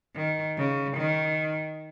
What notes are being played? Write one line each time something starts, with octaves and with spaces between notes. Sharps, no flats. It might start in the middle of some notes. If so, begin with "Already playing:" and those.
D#3
C#3
D#3